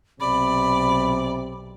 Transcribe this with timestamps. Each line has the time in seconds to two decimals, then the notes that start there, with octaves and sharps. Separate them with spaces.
0.20 B1 C3 D5 B5